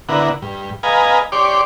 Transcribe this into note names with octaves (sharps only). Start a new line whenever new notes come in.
D3 B3 E4 A#4 F#5
G2
B4 D#5 F5 G#5 A#5
G4 C#5 D5 C6 D6